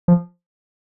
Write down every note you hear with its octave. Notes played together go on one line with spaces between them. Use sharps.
F3